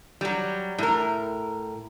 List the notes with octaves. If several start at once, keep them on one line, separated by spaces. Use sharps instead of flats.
F#3 G3
A2 A#4